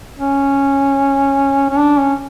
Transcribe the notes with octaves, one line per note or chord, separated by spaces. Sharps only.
C#4
C#4
D4
C#4